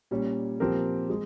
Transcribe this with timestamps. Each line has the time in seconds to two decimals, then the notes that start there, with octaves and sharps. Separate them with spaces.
0.11 A#2 G3 C#4
0.60 A#2 F3 C4 G4 A#4
1.10 G#3